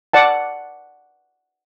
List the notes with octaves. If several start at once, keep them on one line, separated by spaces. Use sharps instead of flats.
D5 F#5 A5